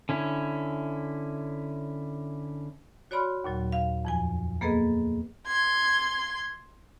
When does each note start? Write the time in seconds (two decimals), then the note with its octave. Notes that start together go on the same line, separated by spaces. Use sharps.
0.09 D3 C#4 E4
3.11 F#4 C#5 D5 B5 C6 F6
3.44 D#2 A#2 F#3
3.72 F5
4.05 F2 F3 G#5
4.61 A#3 B3 G#4 A4 B4 D#5
5.45 C6 G#6